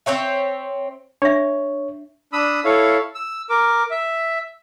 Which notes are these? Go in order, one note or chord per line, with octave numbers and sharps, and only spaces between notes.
C4 C5 C#5 E5
D4 C#5 E5
D4 B5 D#6 E6
E4 A4 C#5 F5
E6
A#4 D6
E5